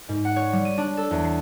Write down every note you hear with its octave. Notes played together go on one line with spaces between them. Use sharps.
G#2
F#5
C#5
G3
D#7
D4
A4
E2
C7